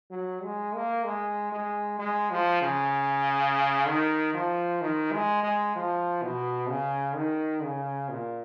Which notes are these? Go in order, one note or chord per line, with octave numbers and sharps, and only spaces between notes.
F#3
G#3
A#3
G#3
G#3
G#3
F3
C#3
D#3
F3
D#3
G#3
G#3
F3
B2
C#3
D#3
C#3
A#2